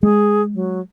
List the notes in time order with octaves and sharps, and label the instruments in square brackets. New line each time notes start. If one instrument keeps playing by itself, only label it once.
[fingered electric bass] G#3 [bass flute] G#4
[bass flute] F#3